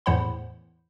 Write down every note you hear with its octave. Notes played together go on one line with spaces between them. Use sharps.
E2 A2 E3 C5 F#5 B5